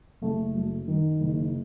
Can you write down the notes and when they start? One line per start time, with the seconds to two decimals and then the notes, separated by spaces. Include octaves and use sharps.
0.22 F#1 A3
0.55 F#2
0.88 D#3
1.20 F#1